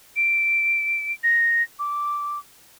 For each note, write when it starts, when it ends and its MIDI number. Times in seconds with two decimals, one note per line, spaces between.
0.16 1.12 98
1.23 1.63 94
1.79 2.39 86